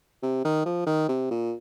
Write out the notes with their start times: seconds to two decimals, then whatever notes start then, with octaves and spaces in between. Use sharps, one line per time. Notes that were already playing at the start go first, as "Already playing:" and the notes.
0.23 C3
0.45 D#3
0.66 F3
0.87 D#3
1.09 C3
1.31 A#2